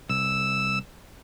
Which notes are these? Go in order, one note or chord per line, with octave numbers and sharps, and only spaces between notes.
C2 E6